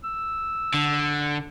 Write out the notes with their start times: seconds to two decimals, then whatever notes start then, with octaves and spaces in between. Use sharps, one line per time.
0.04 E6
0.74 D3